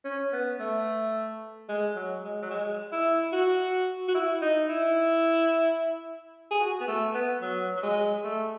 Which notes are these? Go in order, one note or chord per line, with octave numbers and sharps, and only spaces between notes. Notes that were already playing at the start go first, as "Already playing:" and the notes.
C#4
B3
A3
G#3
F#3
G#3
F#3
G#3
E4
F#4
F#4
E4
D#4
E4
G#4
F#4
B3
A3
B3
F#3
F#3
G#3
A3